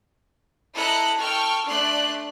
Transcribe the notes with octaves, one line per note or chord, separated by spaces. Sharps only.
E4 A4 D#5 A#5 F#6 C#7
A4 G5 C#6 F6
A3 D4 D5 C6 F#6